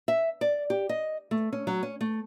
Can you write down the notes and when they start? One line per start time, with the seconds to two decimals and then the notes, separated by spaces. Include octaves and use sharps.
0.08 E5
0.41 D5
0.70 G4
0.89 D#5
1.31 A3
1.53 C#4
1.67 F#3
1.83 C#4
2.01 A3